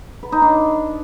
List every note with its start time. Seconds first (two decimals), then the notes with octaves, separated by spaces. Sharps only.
0.23 B4
0.32 D#4
0.42 D4